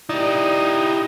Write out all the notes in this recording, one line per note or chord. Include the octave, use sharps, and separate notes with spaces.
D#4 E4 G4 D5